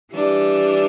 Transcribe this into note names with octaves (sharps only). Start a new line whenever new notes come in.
E3 G3 D4